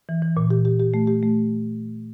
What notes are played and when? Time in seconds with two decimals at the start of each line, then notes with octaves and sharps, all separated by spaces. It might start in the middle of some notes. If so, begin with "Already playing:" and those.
0.09 E3
0.22 E3
0.37 A#2
0.50 G4
0.65 G4
0.80 G4
0.94 A3
1.07 G4
1.23 A3